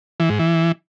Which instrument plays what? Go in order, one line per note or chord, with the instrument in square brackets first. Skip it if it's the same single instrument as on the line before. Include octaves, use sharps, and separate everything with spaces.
[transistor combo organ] E3
G#2
E3